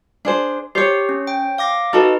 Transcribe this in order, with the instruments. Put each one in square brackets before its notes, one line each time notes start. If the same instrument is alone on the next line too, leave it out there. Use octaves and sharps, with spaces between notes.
[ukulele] D4 G#4 C5
[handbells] G4 [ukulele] C5 C#5
[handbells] C#4
G5
F5 D6 A#6
[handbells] D#4 B4 [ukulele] F#4 A4 D#5